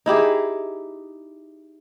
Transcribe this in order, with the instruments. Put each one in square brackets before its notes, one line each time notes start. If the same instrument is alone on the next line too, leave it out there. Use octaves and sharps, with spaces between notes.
[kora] D#4 E4 G4 G#4